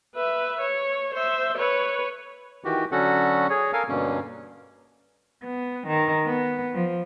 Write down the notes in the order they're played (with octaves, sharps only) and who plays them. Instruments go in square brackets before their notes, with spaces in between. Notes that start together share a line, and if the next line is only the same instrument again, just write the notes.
[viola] B4 E5
C#5
C5 E5
B4 C#5
[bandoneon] D#3 E3 F#4 G4
D3 F#3 C#4 F#4 A4 F#5
G#4 C#5
A4 A#4 F5 G#5
G2 B2 D3 A#3 C#4
[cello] B3
D#3
B3
F3